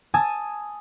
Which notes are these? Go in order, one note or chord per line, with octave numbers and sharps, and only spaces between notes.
G#5 A5 D#6 E6 G#6 A6